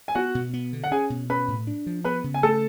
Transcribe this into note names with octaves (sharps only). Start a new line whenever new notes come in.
G#5
B3 F#4 F#5
B2
B3
D3
F#5
C#4 G#4 G#5
B2
C#4 B4 B5
A2
D4
F3
B3 B4 B5
C#3
G#5
A3 A4 A5